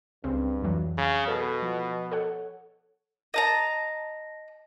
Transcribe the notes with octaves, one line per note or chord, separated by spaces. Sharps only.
C#2 G2 C#3 C4
F2 E3 F#3
C#3
B2 A4
F3
A4 C#5 F#5
D#5 A5 A#5